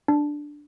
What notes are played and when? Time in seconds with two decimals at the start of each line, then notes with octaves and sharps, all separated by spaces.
0.08 D4